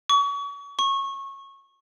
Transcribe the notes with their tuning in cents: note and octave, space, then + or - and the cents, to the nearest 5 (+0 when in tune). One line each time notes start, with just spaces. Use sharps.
C#6 +35
C#6 -20